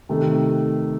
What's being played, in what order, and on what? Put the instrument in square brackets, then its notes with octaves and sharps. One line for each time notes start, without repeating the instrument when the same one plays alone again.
[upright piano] C3 D#3 A3